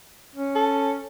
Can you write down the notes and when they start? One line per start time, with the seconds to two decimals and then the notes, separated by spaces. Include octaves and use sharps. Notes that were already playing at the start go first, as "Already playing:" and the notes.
0.35 C#4
0.55 A4